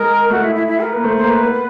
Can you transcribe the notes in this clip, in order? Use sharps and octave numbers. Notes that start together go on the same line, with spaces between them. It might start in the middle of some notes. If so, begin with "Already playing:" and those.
Already playing: G#3 A#4
A3 F#4
E4
E4
E4
A#4
A#3 B4
A3 C5
C5
A#3
B4
B3